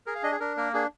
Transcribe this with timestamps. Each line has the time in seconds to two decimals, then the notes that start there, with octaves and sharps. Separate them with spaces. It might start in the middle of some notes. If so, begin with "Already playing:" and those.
0.06 G#4 A#4
0.15 F5
0.23 D4 D#5
0.32 G#4
0.40 D4 A#4
0.57 A#3 A#4
0.74 D4 G#4